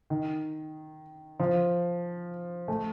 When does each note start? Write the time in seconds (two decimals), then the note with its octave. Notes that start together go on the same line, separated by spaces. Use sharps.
0.10 D#3
1.40 F3
2.68 A3